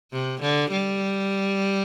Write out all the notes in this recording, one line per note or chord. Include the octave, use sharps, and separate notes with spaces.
C3
D3
G3